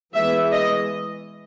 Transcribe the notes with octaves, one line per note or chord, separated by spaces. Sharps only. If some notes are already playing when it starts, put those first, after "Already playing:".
E3 G#3 B3 E5
D#5